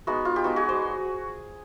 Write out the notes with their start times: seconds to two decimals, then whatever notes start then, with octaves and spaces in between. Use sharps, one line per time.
0.07 G#3 B3 D#4 F#4
0.25 F4
0.36 G4
0.44 G#3 B3 D#4 F#4
0.56 F#4 G#4
0.69 C5 D5